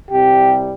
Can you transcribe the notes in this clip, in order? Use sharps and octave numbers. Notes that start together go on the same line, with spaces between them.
C2 C3 G3 G4